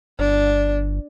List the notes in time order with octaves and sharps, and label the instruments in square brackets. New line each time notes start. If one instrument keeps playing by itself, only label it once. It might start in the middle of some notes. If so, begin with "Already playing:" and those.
[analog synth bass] G1 [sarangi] D4